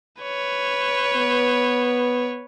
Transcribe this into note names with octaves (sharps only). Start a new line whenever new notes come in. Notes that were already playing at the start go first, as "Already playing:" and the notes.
B4 C#5
B3